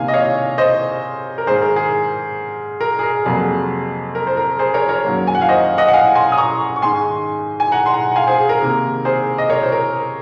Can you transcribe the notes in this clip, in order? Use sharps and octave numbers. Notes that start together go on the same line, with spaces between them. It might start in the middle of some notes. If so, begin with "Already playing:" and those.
Already playing: C3 D#3 A#3 F5 G#5
D#5
C#5 F5
C5 D#5
A#4
G#2 D#3 G#3 G#4 C5
A#4
G#4
A#4
G#4
A#4
F2 C3 F#3 A#3 G#4
A#4
C5
A#4
G#4 C5
A#4 C#5
A#4 C#5
F#2 D#3 F#3 A#3
G#5
F#5
F5
C5 D#5
D#5 F#5
F#5
F5 G#5
G#5 C6
D#6
A#5 C#6
C#6
G#2 D#3 G#3 G#5 C6
G#5
F#5 A#5
C6
F#5 A#5
F#5
F5 G#5
G#4 C5
G#4
A#4
C3 D#3 A#3
G#4 C5
D#5
A#4 C#5
C5
A#4